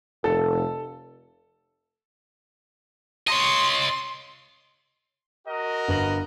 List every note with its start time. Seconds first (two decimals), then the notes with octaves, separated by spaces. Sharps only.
0.24 F1 A4
3.27 C#5 D#5 C6
5.48 F#4 A#4 D#5
5.88 G1 B4 F#7